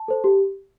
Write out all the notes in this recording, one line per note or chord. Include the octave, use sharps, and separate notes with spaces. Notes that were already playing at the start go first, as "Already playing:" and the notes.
Already playing: A5
A4 C5
G4